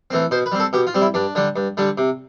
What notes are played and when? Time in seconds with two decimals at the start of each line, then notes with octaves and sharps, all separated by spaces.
0.11 E3 A3 C4
0.31 B2 C5
0.46 B4
0.52 G3 C4
0.60 A4
0.73 B2 G4
0.87 F4
0.94 G3 C4
1.01 E4
1.14 G2 D4
1.35 D3 G3 D4
1.56 G2
1.77 D3 G3 D4
1.98 C3